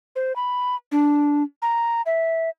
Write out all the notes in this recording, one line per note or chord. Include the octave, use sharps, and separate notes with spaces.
C5
B5
D4
A#5
E5